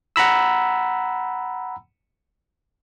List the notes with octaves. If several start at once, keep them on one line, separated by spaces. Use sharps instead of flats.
F#5 A#5 B5 E6